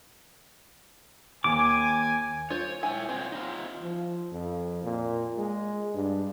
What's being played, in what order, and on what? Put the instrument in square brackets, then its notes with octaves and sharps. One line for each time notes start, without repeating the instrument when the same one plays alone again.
[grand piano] D#2 [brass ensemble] G#5 [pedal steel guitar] D6
[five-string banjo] F4 C5 [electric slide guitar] C#5
[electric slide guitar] E4 G5 [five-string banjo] G#5
[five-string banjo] C4 [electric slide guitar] C5 C#5 F#5
[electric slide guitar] D#4 F4
[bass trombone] F3
F2
A#2
G#3
G2